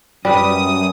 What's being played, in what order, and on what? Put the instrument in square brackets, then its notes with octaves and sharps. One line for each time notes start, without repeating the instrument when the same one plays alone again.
[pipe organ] F#2 D#6 [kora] G3 B4